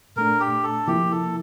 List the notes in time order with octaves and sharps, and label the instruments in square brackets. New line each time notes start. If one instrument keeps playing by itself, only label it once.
[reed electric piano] A#2 A3 D4 [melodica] A#4
[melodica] G4
A4
[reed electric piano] C3 F3 A#3 E4 [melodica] G4
[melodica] A4